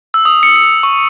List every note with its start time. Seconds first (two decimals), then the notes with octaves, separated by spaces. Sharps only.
0.14 E6
0.25 D#6
0.43 C#7
0.56 C#7
0.83 C#6